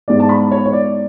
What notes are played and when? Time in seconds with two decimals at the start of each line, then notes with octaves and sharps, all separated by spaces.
0.08 G#2 G#3 B3 D5
0.20 A5
0.29 B5
0.51 C#5
0.66 C#5
0.73 D5